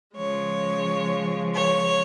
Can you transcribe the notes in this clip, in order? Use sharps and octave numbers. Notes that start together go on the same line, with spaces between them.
C#3 F3 G#3 C#5
C#5